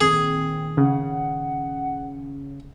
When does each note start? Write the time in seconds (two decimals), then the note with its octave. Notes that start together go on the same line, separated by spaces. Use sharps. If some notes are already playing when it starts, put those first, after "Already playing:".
0.01 A#2 D#3 C4 G#4
0.77 C#3 F#5